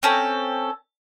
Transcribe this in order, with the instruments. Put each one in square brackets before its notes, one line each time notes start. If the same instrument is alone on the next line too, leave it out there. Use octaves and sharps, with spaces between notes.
[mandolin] C4 C#4 A4